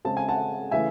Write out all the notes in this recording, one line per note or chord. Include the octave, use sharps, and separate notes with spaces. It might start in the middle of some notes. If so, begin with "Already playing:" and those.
C#3 G#3 C4 A5
G#5
F#5 A5
C#3 E3 A3 E5 G#5